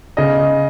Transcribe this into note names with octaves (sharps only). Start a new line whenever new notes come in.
C#3 D#5